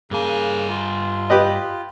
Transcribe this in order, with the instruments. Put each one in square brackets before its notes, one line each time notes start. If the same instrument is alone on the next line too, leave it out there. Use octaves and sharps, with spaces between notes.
[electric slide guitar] G2 G#5 [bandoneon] C#3 A#3
[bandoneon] F4
[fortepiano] G4 B4 D#5